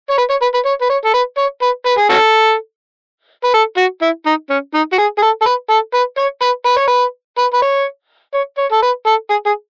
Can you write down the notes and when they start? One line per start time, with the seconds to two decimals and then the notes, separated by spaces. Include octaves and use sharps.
0.10 C#5
0.18 B4
0.29 C#5
0.42 B4
0.54 B4
0.65 C#5
0.81 B4
0.89 C#5
1.04 A4
1.13 B4
1.38 C#5
1.62 B4
1.86 B4
1.98 G#4
2.10 C#4 F#4 A4
3.44 B4
3.54 A4
3.77 F#4
4.02 E4
4.26 D#4
4.50 C#4
4.74 D#4
4.92 F#4
4.98 G#4
5.18 G#4
5.22 A4
5.41 A4
5.46 B4
5.70 A4
5.94 B4
6.18 C#5
6.41 B4
6.66 B4
6.77 C#5
6.88 B4
7.38 B4
7.54 B4
7.62 C#5
8.34 C#5
8.58 C#5
8.72 A4
8.82 B4
9.06 A4
9.30 G#4
9.46 G#4